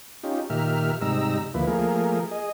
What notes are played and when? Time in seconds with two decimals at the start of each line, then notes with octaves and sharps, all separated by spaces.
0.24 C#4 D#4 F4 G4
0.50 A#2 D#3 G4 A#4 E5 F6
1.02 G#2 C3 G3 D#4 A#5 E6
1.54 D2 F3 A#3 E4 B4
1.67 F3 A3 A#3 G#4 A#4
2.31 G#4 D#5